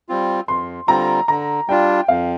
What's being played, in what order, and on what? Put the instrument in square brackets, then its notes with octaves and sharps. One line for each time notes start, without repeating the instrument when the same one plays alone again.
[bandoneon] G3 C4 F4
[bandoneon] F2 [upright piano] C6
[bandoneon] D3 G3 C4 F4 [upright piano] A#5
[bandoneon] D3 [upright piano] A#5
[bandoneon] G3 D4 F4 [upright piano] G5
[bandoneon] F2 [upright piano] F5